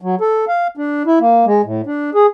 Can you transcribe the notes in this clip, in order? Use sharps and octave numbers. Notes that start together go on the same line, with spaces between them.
F#3
A4
F5
D4
E4
A#3
G#3
A2
D4
G#4